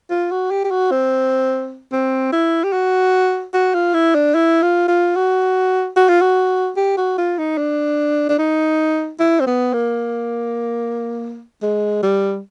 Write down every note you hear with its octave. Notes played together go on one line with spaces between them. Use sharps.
F4
F#4
G4
G4
F#4
C4
C4
E4
G4
F#4
F#4
F4
E4
D4
E4
F4
F4
F#4
F#4
F4
F#4
G4
F#4
F4
D#4
D4
D4
D#4
E4
C4
B3
A#3
G#3
G3